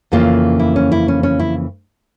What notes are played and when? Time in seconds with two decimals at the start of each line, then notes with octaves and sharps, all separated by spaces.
0.12 F2 C#3 E3 A#3 C#4 F4
0.59 E4
0.76 C#4
0.92 E4
1.08 C#4
1.23 C#4
1.39 E4